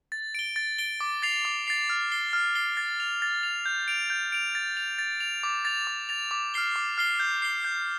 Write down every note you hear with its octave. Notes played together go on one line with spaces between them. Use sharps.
A6
D7 G7
A6
D7 G7
D6
A6 C7 F7
D6
A6 C7 F7
F6
C7 G7
F6
C7 G7
A6
F7
A6
F7
G6
D7 F7
G6
D7 F7
A6
F7
A6
F7
D6
A6 F7
D6
A6 F7
D6
F6 C7 G7
D6
F6 C7 G7
G6
C7 G7
G6